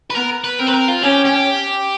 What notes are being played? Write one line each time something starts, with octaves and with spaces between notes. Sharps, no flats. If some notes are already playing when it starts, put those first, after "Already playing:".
B4
B3 A#4
B4
C4 A#4
B4
A#4
F4
C#4 G4
G4